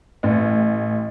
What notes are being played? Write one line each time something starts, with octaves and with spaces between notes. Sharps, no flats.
A1